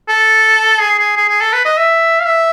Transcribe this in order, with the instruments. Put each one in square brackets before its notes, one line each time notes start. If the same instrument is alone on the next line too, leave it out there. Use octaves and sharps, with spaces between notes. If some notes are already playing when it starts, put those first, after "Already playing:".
[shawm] A4
G#4
G#4
G#4
G#4
A4
B4
D#5
E5
F5
E5